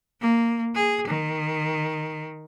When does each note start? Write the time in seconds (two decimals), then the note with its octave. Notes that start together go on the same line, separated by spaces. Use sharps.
0.21 A#3
0.75 G#4
1.08 D#3